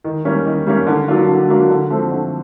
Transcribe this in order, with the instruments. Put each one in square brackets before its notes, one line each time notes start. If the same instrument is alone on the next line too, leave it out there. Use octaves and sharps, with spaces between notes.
[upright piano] D#3
G3 A#3 C#4
D#3
G3 A#3 C#4
D3
F#3 A#3 D4 F4
D3
F#3 A#3 D4 F4
D3
F3 A3 C4
D3